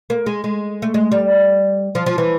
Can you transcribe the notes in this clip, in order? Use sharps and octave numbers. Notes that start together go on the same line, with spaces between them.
A#3
G#3
G#3
A3
G#3
G3
F3
F3
E3